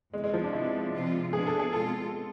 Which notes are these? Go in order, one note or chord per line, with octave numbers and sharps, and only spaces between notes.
E2 C3 E3 G#3
G#3
F3
D4
C3 F3 G#3 B3 E4
C3 F3 G#3 C4 F4
B2 B3 D4 G#4
A4
G#4
B2 G#3 C4 F4 A4